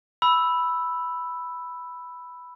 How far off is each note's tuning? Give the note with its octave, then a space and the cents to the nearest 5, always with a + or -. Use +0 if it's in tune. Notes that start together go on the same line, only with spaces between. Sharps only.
B5 +0 E6 +0